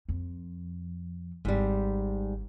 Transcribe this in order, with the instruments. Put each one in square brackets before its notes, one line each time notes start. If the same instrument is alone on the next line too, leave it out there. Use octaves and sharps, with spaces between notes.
[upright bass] F2
[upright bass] G#1 [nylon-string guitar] G#2 G3